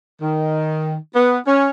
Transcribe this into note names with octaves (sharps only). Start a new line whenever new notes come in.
D#3
B3
C#4